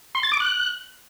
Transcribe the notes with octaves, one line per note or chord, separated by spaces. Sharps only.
C6
A6
D6
F#6